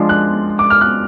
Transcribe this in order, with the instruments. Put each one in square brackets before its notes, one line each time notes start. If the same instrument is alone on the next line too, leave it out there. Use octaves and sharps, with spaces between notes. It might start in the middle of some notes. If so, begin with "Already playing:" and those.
Already playing: [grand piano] F3 G#3 D4 F4
[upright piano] F#6
D6
F6
F#6